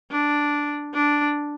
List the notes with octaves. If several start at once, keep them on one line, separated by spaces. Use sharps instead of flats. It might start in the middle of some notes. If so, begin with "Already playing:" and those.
D4
D4